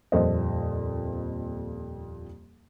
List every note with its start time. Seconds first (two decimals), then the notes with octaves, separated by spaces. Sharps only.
0.12 D#1 F2 A#2 C5 D#5